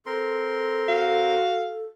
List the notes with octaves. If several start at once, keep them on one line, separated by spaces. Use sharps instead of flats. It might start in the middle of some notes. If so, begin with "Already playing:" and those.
C4 A4 A#4 C6
F#4 F5